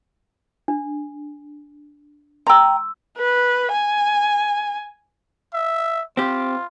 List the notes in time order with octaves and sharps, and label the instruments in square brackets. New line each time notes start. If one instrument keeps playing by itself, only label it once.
[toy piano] D4
[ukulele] G5 A#5 [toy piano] C6 E6
[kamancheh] B4
G#5
[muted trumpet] E5
[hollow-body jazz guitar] C4 G4 [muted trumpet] F4